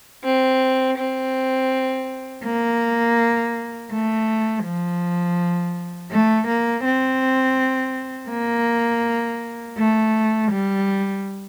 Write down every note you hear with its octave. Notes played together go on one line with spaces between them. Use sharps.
C4
C4
A#3
A3
F3
A3
A#3
C4
A#3
A3
G3